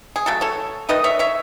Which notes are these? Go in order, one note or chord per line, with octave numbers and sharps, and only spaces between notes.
G#4
C#3 F#3 A3 A4
A4 C#5
D#3 A3 D#4 B4 D#5
C#5 E5
C#5 E5